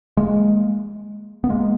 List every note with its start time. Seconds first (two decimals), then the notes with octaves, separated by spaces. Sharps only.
0.17 G#3 A#3
1.44 B3
1.49 G#3 A#3